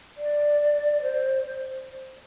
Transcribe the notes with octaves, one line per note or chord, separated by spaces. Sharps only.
D5
C5